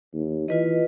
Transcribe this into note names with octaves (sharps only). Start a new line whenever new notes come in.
D#2
E3 F4 B4 D#5